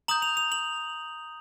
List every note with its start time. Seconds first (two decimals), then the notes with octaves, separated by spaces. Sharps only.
0.08 A#5 D#6 G6 F#7
0.22 F7
0.37 F7
0.52 F#7